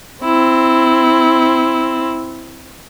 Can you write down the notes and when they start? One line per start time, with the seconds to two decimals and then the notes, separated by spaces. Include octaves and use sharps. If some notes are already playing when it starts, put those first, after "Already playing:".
0.24 C4 E4